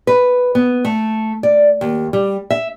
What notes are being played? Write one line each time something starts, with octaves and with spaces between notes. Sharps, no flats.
B4
B3
A3
D5
D#2
G3
E5